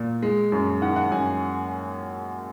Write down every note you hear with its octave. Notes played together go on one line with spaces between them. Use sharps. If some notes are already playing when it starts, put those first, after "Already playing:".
Already playing: A#2
G#3
F#2
D#3 F#5
F#5
F#2 G#5